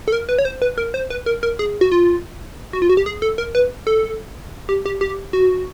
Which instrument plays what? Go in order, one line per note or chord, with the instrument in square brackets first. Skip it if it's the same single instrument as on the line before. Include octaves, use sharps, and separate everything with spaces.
[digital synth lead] A4
A#4
B4
C#5
C5
B4
A#4
C5
B4
A#4
A#4
G#4
F#4
F4
F#4
F4
F#4
G4
G#4
A4
A#4
B4
A4
G4
G4
G4
F#4